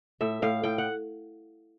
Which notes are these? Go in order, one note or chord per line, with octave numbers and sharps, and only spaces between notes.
A2 E5
A2 F5
A2 G5
F#5